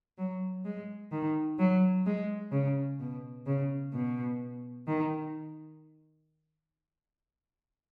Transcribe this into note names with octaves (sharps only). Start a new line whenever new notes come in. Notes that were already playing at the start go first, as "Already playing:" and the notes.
F#3
G#3
D#3
F#3
G#3
C#3
B2
C#3
B2
D#3